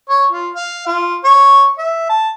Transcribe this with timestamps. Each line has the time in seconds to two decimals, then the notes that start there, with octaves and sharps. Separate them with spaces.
0.10 C#5
0.32 F4
0.55 F5
0.87 F4
1.24 C#5
1.79 E5
2.09 A5